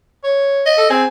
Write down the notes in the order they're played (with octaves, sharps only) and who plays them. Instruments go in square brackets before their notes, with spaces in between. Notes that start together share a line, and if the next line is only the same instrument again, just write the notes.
[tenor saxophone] C#5
[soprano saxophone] D#5
[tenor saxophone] A4
[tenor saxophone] C4 [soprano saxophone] G#4